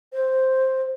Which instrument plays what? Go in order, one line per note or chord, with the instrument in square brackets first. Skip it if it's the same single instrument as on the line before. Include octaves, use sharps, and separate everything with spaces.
[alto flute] C5